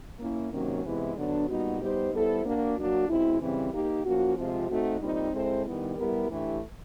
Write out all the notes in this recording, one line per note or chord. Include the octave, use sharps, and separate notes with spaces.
A#3 C#4 E4
C3 D#3 F#3 A#3 C#4
C3 E3 G#3 B3 E4
D3 F#3 B3 D4
A#2 G3 B3 D#4 F#4
G3 B3 D#4 G4 C5
G3 B3 E4 A4 C5
A#3 D4 F#4
F#3 A#3 D4 F#4
B2 G#3 C4 E4
C#3 E3 G3 C4
A#3 D#4 G4
F3 A#3 C#4 F#4
C3 F3 G#3 C4 F4
A3 C4 D#4 F#4
A#2 G3 C4 D#4
G#3 C4 E4 A4 C5
D#3 G3 B3 E4
G3 B3 E4 G4 A#4
A2 E3 A3 D4 G4